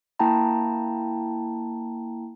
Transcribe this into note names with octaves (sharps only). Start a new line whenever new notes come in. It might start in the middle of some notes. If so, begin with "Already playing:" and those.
A#3 E4 G5 A5 A#5